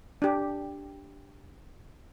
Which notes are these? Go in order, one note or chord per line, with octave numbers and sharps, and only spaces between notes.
D4 G4